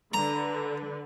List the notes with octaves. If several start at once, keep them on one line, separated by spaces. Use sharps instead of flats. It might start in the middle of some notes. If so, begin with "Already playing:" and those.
D3 B4 A#5